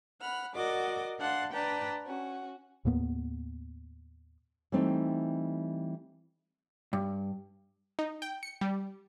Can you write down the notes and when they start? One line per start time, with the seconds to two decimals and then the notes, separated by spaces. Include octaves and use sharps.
0.21 F#5 B5 F6
0.55 F#4 A#4 D5 D#5 F#5 D6
1.18 D4 D5 F5 F#5 A5 C6
1.52 D4 B4 D5 G5 A5 A#5
2.05 C#4 F#4
2.85 D#2 A2 A#3 B3
4.72 E3 G3 A3 C4 D#4
6.93 G2
7.99 D#4
8.22 G5
8.43 C#7
8.61 G3